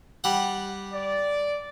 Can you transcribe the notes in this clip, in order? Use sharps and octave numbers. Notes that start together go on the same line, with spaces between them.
G3 F#5
D5